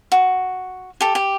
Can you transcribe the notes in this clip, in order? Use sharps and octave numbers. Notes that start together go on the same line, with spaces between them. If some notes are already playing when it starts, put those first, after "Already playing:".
F#4
G4 A4
G4